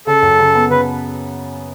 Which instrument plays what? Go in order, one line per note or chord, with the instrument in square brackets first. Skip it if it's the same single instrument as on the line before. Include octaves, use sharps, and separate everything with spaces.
[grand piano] C#3 [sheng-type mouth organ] A4
[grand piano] F#2
C#3
B3
[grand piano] C#3 [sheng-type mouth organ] B4